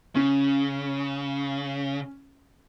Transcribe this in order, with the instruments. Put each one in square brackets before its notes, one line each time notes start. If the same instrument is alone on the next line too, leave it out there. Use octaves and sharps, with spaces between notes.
[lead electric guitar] C#3 [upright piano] C#4